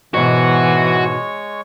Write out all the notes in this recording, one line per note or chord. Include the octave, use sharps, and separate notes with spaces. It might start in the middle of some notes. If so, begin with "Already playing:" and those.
G#2 B2 E3 G#3 F#4 C#5 C#6